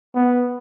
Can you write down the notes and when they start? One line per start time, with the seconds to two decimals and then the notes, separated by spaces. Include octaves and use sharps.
0.15 B3